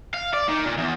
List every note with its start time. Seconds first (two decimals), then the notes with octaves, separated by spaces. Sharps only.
0.14 F5
0.33 D5
0.49 D#3
0.65 A#2
0.78 E2